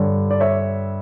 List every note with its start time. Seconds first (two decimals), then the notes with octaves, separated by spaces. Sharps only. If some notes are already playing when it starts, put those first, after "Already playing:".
Already playing: G2 D3 G3 C#5
0.31 D5
0.40 C#5 E5